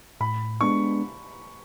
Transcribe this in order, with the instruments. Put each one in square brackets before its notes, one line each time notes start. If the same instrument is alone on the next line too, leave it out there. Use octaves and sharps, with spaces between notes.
[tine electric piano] A2 [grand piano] B5
[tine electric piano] G#3 B3 D4 [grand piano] C#6